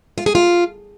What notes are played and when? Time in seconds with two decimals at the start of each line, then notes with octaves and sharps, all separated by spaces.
0.18 F4
0.26 G#4
0.35 F4